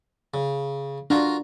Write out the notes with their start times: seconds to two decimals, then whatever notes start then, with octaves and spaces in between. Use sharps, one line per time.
0.34 C#3
1.10 D4 F4 F#4 A#4